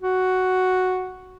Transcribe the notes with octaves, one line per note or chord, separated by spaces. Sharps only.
F#4